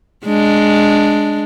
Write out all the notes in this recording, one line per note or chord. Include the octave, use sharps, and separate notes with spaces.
G#3 D4